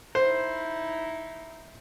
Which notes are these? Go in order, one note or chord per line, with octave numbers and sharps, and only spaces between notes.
D#4 E4 C5